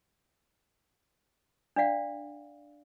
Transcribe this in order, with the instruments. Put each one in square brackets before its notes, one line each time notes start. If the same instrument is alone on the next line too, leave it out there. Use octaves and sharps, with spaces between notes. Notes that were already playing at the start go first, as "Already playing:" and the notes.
[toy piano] D4 D5 F5 F#5